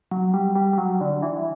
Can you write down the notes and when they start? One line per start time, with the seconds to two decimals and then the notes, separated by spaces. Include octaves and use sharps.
0.11 F#3
0.34 G3
0.55 G3
0.73 G3
0.78 F#3
1.01 D3
1.22 E3